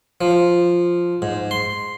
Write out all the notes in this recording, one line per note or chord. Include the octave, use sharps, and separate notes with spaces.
F3
G#2
C6